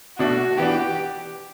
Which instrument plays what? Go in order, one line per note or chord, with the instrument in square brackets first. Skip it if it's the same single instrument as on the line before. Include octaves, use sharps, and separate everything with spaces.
[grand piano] B2 A3 D4 [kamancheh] F#4
[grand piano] E3 B3 D4 [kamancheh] G4